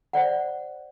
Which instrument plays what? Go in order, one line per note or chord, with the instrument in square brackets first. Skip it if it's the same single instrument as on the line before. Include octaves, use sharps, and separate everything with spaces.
[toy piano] C5 D5 F#5